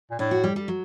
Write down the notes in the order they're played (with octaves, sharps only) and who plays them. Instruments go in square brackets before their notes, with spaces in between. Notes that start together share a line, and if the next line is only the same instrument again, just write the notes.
[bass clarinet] A#2
[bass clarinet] A2 [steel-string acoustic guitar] D4
[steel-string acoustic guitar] F#4
G3
G3
F#3